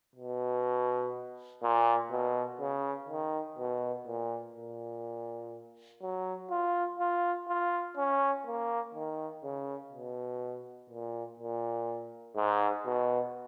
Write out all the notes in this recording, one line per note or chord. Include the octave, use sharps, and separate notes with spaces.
B2
A#2
B2
C#3
D#3
B2
A#2
A#2
F#3
F4
F4
F4
C#4
A#3
D#3
C#3
B2
A#2
A#2
G#2
B2